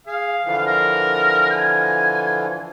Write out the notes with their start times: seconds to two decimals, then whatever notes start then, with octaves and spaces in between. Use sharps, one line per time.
0.07 G#4 F5
0.45 D3 E3 F3
0.66 A#4
1.50 G#5